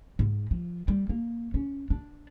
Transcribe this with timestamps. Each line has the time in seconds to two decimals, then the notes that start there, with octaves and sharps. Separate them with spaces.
0.19 G#2
0.51 F3
0.88 G3
1.09 A#3
1.54 C#4
1.90 D4